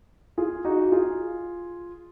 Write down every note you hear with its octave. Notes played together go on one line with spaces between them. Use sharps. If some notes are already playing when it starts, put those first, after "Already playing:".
F4 G#4
D#4 F#4
F#4
F4 G#4